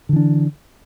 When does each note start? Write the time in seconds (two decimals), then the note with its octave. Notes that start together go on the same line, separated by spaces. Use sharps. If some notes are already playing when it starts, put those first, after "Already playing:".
0.09 D3
0.13 E3
0.16 D4